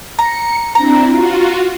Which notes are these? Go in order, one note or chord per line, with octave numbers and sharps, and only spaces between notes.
A#5 C#7
C4 D4 E4 A#5
F4 F#4